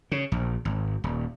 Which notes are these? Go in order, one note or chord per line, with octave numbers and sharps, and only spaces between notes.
C#3
A#1
G#1
D#1